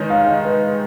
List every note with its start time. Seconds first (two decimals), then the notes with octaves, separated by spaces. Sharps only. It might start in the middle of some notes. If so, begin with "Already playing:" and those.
Already playing: D#3 G#3 D#4 B4 C#5
0.10 F5
0.27 D#5
0.45 B4